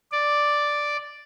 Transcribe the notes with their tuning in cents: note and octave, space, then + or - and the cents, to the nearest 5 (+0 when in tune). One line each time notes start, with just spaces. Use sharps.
D5 +0